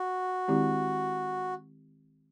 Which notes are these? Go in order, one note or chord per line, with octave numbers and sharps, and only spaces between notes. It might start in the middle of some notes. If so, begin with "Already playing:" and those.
Already playing: F#4
D#3 G#3 C4 E4 G4